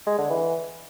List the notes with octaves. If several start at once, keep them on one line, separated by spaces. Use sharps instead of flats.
G#3
D3
E3